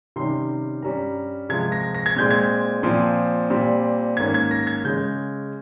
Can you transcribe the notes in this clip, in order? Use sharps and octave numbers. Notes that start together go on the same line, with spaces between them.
C3 D#3 G3 C#4 C6
G2 G3 C#4 A#5
C3 F3 G#3 G#6
A#6
A#6
G#6
A#2 G#3 C4 G6
G#6
A#2 F3 C4
A#2 G3 C4
G#2 D#3 A#3 C#4 G#6
G#6
A#6
G#6
C#3 G#3 C#4 G6